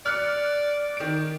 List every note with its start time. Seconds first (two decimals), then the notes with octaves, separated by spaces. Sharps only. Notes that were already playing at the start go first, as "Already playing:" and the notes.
0.06 D5 F6 F#6 C#7
0.97 D#3 D7